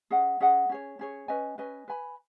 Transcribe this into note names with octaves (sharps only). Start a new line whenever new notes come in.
C#4 G#4 D#5 F#5
C#4 G#4 D#5 F#5
C#4 G#4 C#5
C#4 G#4 C#5
C#4 B4 D#5 G#5
C#4 B4 D#5 G#5
B4 G#5 B5